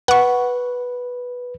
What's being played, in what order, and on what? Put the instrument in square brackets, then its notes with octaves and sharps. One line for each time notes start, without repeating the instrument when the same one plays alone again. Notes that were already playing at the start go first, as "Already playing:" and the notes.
[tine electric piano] B4 [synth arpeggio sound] F#5 C#6